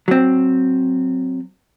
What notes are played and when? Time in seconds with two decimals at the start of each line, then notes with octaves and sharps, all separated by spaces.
0.08 F#3 C4